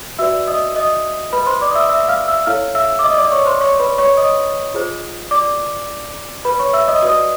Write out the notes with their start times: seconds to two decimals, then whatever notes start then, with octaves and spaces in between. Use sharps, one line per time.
0.19 F#4 B4 D5 E5 E6
0.47 D#5 D#6
0.76 D#5 D#6
1.33 B4 B5
1.47 C5 C6
1.61 D5 D6
1.71 D#6
1.75 E5 E6
1.89 E5 E6
2.08 F5 F6
2.28 E5 E6
2.46 E4 A4 C#5 F5 F6
2.75 E5 E6
2.99 D6
3.04 D#5 D#6
3.18 D5 D6
3.32 C#5 C#6
3.46 C5 C6
3.60 C#5 C#6
3.80 B4 B5
3.98 C#5 C#6
4.17 D#5 D#6
4.74 F4 G#4 C5
5.31 D5 D6
6.45 B4 B5
6.59 C#5 C#6
6.73 E5 E6
6.88 D#5 D#6
7.02 F#4 B4 D5 D#5 D#6